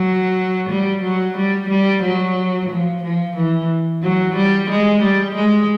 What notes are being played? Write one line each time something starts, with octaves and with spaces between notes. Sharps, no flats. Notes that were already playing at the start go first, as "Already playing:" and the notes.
Already playing: F#3
G3
F#3
G3
G3
F#3
F3
F3
E3
F#3
G3
G#3
G3
G#3